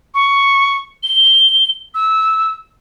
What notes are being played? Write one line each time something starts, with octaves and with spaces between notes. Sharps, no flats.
C#6
G7
E6